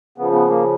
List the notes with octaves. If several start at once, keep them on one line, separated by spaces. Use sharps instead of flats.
C#3 F3 B3
B3
A#3